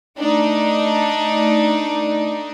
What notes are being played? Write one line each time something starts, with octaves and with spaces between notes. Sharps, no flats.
A3 D4 D#4